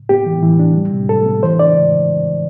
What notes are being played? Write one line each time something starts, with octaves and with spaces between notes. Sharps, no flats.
B3 G4
E3
E3
D4
G3
C3
C3 A4
B3
E3 C5
D4 D5